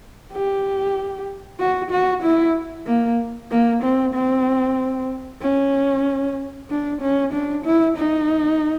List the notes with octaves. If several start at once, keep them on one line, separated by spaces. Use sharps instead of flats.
G4
F#4
F#4
E4
A#3
A#3
C4
C4
C#4
D4
C#4
D4
E4
D#4